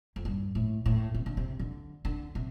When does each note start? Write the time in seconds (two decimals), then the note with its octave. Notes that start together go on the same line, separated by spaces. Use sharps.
0.16 F2
0.25 G2
0.55 A2
0.86 A2
1.15 C3
1.26 D3
1.37 C3
1.59 D3
2.05 D3
2.35 C3